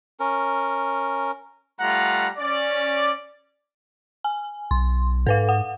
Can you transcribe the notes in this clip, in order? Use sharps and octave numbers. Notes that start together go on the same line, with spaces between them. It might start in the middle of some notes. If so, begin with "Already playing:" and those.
C#4 A#4
G3 A3 F4 F#5 A#5
C#4 D5
G#5
B1 C6
G#2 A4 B4 F5
F#5